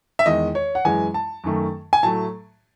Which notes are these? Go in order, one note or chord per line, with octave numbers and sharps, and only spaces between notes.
E5
E2 D#3 G#3 D#5
C#5
F#5
F#2 E3 G#3 G#5
A5
F#2 D#3 A3
G#5
A2 F#3 A3 A5